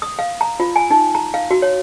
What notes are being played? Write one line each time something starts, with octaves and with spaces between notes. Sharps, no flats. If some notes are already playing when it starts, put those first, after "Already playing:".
D#6
F5
A#5
F4
G#5
D#4
A#5
F5
F#4
C#5